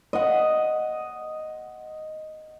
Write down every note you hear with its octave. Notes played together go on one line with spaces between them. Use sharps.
D#5 F#5